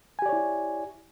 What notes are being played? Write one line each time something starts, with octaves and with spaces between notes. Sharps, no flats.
E4 G4 C#5 D5 G#5